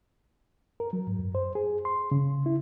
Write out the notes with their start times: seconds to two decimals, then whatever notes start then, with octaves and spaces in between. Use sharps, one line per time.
0.80 A#4
0.93 F#3
1.07 G#2
1.19 F#2
1.35 C5
1.55 G#4
1.85 C6
2.12 C#3
2.46 E4